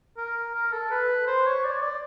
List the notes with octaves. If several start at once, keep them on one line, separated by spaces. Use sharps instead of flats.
A#4
A#4
A4
B4
C5
C#5
D5
D5